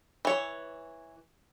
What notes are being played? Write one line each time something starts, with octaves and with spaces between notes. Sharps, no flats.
E3 C#5